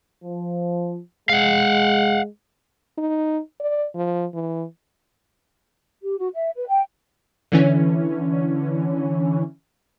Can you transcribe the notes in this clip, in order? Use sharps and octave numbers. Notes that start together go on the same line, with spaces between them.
F3
G#3 F5 F#5
D#4
D5
F3
E3
G4
F#4
E5
B4
G5
D3 E3 C#4